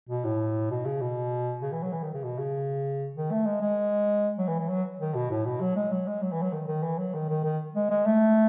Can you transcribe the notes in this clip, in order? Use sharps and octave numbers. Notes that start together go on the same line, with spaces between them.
B2
A2
B2
C#3
B2
C#3
E3
F#3
E3
D#3
C#3
B2
C#3
D#3
A3
G#3
G#3
F#3
E3
E3
F#3
D#3
B2
A2
B2
F#3
G#3
F#3
G#3
F#3
E3
F#3
D#3
D#3
E3
F#3
D#3
D#3
D#3
G#3
G#3
A3